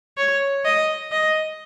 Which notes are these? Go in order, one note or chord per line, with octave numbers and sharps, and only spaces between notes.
C#5
D#5
D#5